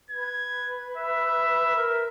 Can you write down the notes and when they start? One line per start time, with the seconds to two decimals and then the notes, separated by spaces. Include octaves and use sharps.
0.11 B4 G#6
0.97 E5
1.75 A#4